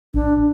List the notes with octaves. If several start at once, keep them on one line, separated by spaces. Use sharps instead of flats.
A1 D4